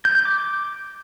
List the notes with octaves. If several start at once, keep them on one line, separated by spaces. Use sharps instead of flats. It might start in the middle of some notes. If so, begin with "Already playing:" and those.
G6
G6
D6